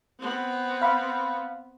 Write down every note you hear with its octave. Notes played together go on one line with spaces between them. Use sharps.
B3 C4
F5 B5